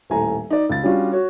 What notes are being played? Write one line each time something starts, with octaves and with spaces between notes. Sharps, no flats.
D#1 A2 A4 G#5 A#5
D#4 D5
C#2 A6
G3 C#4 D4 F4 F#4
F#4 C#5